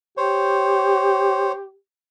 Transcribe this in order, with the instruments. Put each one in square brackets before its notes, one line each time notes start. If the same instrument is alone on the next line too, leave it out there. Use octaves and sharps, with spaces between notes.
[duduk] G4 [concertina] C5 C#5